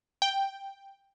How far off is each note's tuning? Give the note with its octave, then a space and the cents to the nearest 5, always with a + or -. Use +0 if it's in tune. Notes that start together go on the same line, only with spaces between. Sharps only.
G5 +0